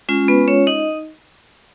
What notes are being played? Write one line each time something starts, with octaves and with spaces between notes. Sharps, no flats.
G#3 C#4 F4
B3 B4
C#4 C#5
D#4 D#5